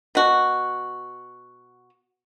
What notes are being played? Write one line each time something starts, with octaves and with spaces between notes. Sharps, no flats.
B2 F#4